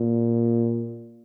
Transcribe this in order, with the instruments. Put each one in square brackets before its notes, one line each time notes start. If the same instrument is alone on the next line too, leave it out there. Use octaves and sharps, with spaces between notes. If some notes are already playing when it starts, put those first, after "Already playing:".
Already playing: [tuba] A#2